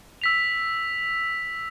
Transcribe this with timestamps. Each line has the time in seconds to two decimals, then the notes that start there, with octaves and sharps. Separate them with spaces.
0.22 E6 B6 F7